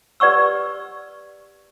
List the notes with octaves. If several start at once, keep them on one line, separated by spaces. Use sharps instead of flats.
G4 B4 D5 F#5 C#6 E6